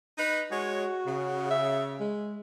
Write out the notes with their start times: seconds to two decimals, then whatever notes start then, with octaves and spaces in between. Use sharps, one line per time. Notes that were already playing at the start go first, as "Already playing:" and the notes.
0.18 D#4 B4
0.51 G#3 F#4 C#5
1.06 C#3
1.51 E5
2.00 G#3